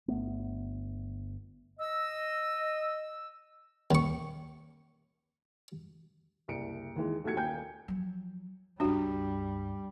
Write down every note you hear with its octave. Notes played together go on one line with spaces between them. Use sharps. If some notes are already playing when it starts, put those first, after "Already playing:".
G1 A3 B3
D#5 E6
D#2 C#6
F#1 C2 C#7 D7
D#2 E3 G#3
B1 A3 F#4 G4 G#6 C#7
D#1 A#3 G5 G#5 G6
F3 F#3
C#2 G2 G3 D4 F#4